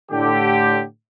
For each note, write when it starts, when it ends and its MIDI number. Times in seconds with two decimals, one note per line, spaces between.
0.11 0.82 45
0.11 0.82 50
0.11 0.82 67